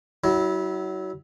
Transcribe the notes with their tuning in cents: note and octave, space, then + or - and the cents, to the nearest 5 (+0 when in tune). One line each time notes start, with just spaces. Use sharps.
F#3 +25 E4 -20